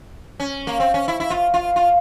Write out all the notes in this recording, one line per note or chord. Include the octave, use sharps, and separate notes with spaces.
C#4
A#3
C4
C#4
E4
E4
F4
F4
F4